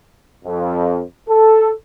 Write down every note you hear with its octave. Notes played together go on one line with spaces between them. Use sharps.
F2
A4